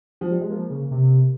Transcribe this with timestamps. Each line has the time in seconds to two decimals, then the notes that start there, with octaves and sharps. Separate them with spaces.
0.21 F3
0.31 G3
0.41 G#3
0.50 F3 A#3
0.70 C#3
0.91 C3